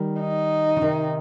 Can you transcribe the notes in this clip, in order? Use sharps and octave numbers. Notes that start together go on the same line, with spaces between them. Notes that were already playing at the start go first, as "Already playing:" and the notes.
Already playing: D#3 G3
D#4
C#3
C3 D#3